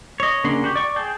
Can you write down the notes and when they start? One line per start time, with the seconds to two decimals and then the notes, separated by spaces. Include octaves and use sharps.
0.20 C#5 D#5
0.44 C#3 A#3 D4 F#5 C6
0.64 F#4 G4
0.75 D5 C#6
0.96 G#4 G5 A5